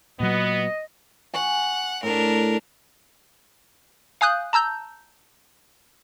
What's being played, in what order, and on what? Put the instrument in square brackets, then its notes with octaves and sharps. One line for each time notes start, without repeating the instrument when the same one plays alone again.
[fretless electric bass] A#2 F#3 [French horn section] B3 [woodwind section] D#5
[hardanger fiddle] F#5 [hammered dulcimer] G#5 C#6
[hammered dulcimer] A2 [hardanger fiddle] D4 A#4
[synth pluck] F5 G#5 D#6 F#6 G6
A5 A#5 E6 G6